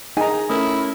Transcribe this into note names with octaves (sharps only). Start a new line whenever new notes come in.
D#4 G#4 G#5 A#5
A3 C#4 E4 A#4 D#6